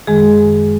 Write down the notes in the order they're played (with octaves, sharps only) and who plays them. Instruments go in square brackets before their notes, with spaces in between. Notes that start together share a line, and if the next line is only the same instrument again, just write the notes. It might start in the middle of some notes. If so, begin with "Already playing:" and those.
[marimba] F#2 D#3 G#3 G#4